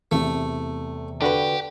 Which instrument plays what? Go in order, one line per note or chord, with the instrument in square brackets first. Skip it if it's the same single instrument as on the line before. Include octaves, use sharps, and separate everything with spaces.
[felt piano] E2 C3 [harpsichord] A3
[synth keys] D3 F#4 B4 [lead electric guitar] G4